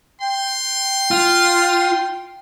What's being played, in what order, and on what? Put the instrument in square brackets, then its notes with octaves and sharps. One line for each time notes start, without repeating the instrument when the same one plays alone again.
[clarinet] G5 [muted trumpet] C6
[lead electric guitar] F4